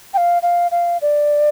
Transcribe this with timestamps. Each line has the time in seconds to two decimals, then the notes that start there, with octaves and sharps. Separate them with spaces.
0.14 G5
0.17 F5
0.42 F5
0.71 F5
1.01 D5